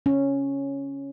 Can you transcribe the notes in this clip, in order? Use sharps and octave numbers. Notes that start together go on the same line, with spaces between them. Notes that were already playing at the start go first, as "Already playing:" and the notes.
C#4